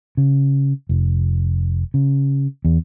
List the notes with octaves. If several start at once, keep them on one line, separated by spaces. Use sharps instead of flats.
C#3
F1
C#3
E2